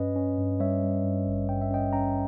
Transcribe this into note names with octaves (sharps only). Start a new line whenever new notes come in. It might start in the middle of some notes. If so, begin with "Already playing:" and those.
Already playing: G2 C#4 B4 D#5
C#4
G2
G3 C#5 E5
G3
G2
G#1
G2 G5
E5
C#4 D#5 G5
C#4 G5 A#5